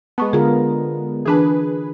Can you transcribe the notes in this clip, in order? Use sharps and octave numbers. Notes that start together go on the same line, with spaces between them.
G#3 B3 A5 C#6
D3 F4 G#4 A#4
E3 D4 G#4 B4 A5